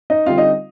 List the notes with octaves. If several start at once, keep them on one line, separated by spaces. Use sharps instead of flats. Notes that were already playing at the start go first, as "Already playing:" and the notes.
D#4 D#5
D3 G3 C4 F4 F5
D#4 D#5